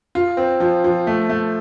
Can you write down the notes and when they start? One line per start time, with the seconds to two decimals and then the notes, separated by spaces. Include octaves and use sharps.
0.15 F4
0.37 C4
0.60 F3
0.84 F3
1.07 A3
1.29 A3